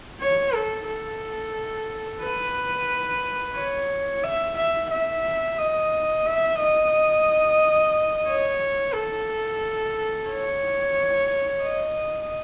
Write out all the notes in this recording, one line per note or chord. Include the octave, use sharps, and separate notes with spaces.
C#5
A4
A4
B4
C#5
E5
E5
E5
D#5
E5
D#5
C#5
A4
C#5
D#5